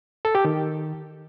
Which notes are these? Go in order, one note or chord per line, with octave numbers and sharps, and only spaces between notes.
A4
G4
D#3